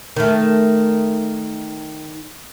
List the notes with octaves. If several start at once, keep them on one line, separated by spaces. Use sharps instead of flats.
D#3 A3